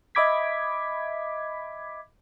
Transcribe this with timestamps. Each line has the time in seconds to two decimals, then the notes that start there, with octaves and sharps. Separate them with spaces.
0.15 D#5 E5 B5 D6 G#6 B6